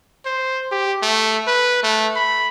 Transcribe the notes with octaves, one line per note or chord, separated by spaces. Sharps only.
C5
G4
A3
B4
A3
B5